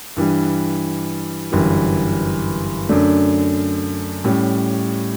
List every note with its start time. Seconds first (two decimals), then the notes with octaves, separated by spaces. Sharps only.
0.16 G2 E3 G3
1.52 G1 F#2 E3 G3
2.89 F#2 D3 A3 D4
4.24 A2 G3 C#4